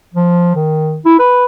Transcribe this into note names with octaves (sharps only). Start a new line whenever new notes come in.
F3
D#3
E4
B4